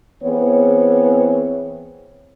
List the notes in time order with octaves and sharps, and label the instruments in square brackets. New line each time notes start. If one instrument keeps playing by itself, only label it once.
[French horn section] E3 B3 C4 G#4 C#5